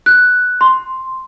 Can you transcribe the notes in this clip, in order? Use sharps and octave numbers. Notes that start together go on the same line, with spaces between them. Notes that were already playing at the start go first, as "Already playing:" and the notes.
F#6
C6